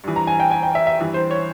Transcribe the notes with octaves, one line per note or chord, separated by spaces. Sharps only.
G2 E3
A#5
G#5
G5
G#5
G5
E5
E5
G2 E3
C5
C#5